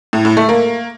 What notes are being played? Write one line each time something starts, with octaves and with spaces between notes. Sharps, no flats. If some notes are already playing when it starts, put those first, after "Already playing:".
A2
A2
A3
A#3